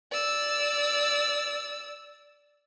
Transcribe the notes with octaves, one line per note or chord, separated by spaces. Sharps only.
D5 E6